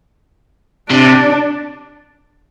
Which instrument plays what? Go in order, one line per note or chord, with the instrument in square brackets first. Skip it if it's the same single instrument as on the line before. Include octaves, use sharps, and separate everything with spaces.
[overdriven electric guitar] C3 [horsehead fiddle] D4